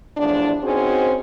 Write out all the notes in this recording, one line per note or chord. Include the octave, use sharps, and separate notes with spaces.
E2 A2 F3 D4
C4 C#4 D#4 F#4 G#4 C5